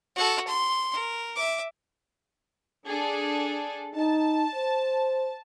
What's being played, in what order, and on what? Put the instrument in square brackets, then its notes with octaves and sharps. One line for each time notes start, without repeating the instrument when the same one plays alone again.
[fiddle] F#4 A4
C6
A#4
E5 D6
[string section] D4 G#4 A4
[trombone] D#4 [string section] A5
[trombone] C5